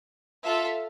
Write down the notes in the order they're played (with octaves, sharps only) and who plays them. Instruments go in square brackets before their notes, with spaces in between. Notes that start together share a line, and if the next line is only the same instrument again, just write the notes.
[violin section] F4 A4 E5